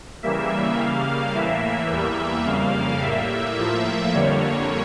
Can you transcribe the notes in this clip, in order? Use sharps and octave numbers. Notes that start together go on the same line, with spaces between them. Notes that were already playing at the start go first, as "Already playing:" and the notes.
C#3 E3 G3 A#3 E5
C#3 G3 A#3 F5
A2 E3 A#3 E5
E2 E3 G3 A#3 E5
F2 C#3 G3 A#3 F5
A2 G3 A#3 E5
A2 F3 A#3 E5
F2 D3 G3 A#3 C#5